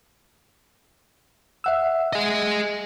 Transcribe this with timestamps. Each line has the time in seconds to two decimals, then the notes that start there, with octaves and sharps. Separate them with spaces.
1.64 E5 F#5 E6
2.13 G#4 D#5